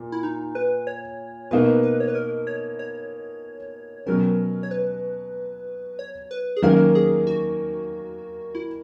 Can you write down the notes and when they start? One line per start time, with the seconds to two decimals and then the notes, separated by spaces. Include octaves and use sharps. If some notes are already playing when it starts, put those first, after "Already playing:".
Already playing: A#2
0.12 E4
0.23 D#4
0.55 B4
0.87 C#5
1.51 B2 A#3 D#4 B4
1.83 B4
2.00 C#5
2.08 B4
2.15 A#4
2.47 C#5
2.79 C#5
4.06 B2 F#3 C#4 A#4
4.63 C#5
4.71 B4
5.99 C#5
6.31 B4
6.57 G#4
6.62 D#3 F#3 A#3 C#4 A#4
6.95 G#4
7.27 F#4
8.55 E4